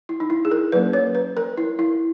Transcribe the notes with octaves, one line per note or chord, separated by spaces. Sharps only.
E4
D#4
E4
G#4
A#4
F#3 A#3 C#4 B4
C#5
B4
A#4
E4
E4